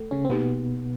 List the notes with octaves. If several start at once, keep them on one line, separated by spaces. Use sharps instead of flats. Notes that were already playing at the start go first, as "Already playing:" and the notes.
Already playing: A3 A4
C#3 C#4
C4
B2 A#3 B3 D#4 G4